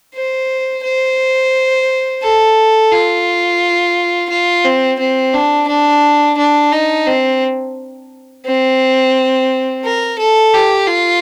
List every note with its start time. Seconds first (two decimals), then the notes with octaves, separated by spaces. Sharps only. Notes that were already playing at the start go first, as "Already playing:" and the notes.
0.14 C5
0.83 C5
2.22 A4
2.92 F4
4.30 F4
4.64 C4
4.99 C4
5.34 D4
5.68 D4
6.38 D4
6.72 D#4
7.07 C4
8.45 C4
9.84 A#4
10.19 A4
10.53 G4
10.87 F4